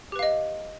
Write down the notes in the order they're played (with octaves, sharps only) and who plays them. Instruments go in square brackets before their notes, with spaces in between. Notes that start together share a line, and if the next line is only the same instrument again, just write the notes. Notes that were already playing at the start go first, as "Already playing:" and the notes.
[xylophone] G4
B4
F5
D#5